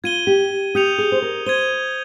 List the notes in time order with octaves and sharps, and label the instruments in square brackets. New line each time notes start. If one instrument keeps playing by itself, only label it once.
[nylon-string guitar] F4 [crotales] G#6 D#7 G7
[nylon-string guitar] G4
[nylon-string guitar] G4 [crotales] D#6 G6 C#7 F7
[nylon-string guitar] G#4
C5
A#4
[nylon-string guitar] C5 [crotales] G#6 D#7 G7